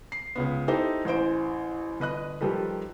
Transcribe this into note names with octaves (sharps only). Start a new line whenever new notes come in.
C7
C#2 C#3 B3
D#4 E4 G4 A4 C5
A1 E3 C5 D7
G1 B4 D#5 F#6
D#3 F3 G3 G4 A4 B4